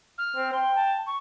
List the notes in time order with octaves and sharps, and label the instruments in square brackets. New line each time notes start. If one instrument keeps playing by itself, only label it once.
[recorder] F6
[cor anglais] C4
[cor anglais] G5 [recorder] C6
[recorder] A5
C#6